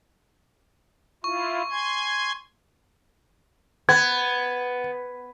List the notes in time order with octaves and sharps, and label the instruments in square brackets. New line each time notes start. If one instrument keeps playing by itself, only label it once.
[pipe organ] E4 F4 [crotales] C#6
[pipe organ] G#5 C6 G#6
[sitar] B3 [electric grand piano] G#6